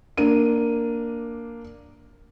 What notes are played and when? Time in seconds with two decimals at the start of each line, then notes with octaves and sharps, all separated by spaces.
0.17 A#3 D4 D#7